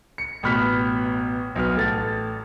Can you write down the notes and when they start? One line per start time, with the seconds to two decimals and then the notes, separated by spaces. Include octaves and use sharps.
0.18 C#7
0.43 A1 B2 B5 F6 F#6 B6
1.56 B1 B3 B4 F6
1.75 A1 A4 A6